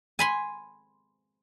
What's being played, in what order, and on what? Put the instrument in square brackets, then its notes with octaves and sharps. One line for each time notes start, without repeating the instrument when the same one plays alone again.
[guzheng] G#5 B5 C6